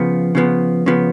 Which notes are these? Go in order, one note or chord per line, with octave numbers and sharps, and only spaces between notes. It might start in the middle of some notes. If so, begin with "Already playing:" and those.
Already playing: C#3 F3 B3
C#3 F3 B3
C#3 F3 B3